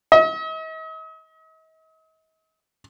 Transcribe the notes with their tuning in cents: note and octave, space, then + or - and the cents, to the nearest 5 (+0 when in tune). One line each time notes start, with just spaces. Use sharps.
D#5 +45